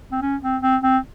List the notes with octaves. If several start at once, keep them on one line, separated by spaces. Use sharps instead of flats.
C4
C#4
C4
C4
C4